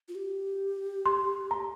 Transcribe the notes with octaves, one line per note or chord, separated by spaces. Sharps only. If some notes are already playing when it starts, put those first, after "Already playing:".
F4
G4
C6
A#5